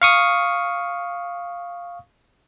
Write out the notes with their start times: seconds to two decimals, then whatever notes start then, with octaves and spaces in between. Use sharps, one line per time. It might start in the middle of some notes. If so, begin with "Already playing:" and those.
0.02 F5 C#6 D#6